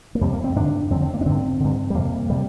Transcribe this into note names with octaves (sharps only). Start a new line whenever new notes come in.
A#3
F2 C3 G3
A#3
C4
G2 D3 D4
F2 D3 C4
C4
A#3
D4
G2 D3 C4
G2 D3
G3
F2 C3 A#3
C3 G3